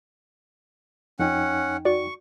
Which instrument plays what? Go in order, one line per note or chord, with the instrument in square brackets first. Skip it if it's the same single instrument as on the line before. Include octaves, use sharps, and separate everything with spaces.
[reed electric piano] F2 D#4 G5 [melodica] C#4 F#5
[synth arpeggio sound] F#4 D5 [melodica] C#6